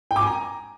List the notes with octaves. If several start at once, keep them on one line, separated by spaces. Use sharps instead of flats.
G5
D6
G#5
A#5